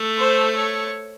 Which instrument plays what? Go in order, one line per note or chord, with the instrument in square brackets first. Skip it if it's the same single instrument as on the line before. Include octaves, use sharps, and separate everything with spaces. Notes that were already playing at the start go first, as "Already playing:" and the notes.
Already playing: [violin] A3
[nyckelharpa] C5
C#5